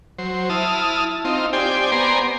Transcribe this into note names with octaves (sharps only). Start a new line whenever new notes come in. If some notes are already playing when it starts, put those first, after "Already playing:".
F#3 C5
E4 A5 D#6 F6
C4 D#4 F4
G4 C5 D5 G5 G#5
B3 C5 D5 G#5 A#5 C6